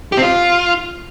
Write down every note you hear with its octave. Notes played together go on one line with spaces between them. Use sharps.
G4
C4
F4